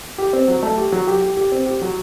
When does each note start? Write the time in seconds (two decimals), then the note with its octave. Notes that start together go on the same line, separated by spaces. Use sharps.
0.18 G4
0.33 C4
0.48 F#3
0.63 A3
0.77 G4
0.92 F#3
1.07 G4
1.22 G4
1.37 G4
1.52 C4
1.66 G4
1.81 F#3